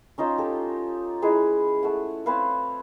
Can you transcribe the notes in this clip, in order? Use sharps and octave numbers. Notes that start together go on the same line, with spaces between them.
C#4 D#4 F4 C5
G4 A4
G#3 E4 G#4 B4
A3 F#5
C4 B4 C#5 F5